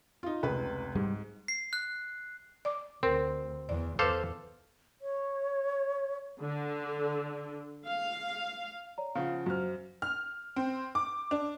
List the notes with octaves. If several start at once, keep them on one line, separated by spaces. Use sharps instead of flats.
D#4 F4
F1 C#2 B4
G#2 G3
C7
F#6
D5 D6
D2 C4 A#4
E2 D5
E2 A4 B4 C5 F5 D6
C#5
D3
F5
C#5 D5 A#5
C#3 F3 F5 F#5
F#2 F#4 C5 F6
F6
C4
D6
D4